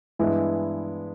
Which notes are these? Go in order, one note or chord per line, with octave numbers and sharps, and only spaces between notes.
G2 E3 G#3 B3 E4